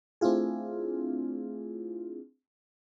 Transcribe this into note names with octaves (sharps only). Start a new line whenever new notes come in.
A3 C4 D4 E4 F4 G#4